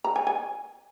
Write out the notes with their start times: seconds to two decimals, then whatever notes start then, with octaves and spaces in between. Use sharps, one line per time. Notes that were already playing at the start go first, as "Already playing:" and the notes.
0.04 A#5
0.16 G#5
0.27 G#5